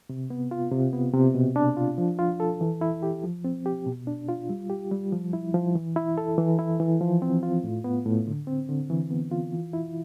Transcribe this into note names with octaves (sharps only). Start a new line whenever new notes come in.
C3
B3
F4
C3
B3
C3
B2
D4
F4
F3
F4
A4
E3
E4
G4
F3
C4
G4
B2
D4
F4
G3
G4
G3
F3
E4
F3
E3
E4
A4
E3
E4
E3
F3
C4
F4
A2
B3
A2
D3
C4
D3
E3
B3
F4
E3
E4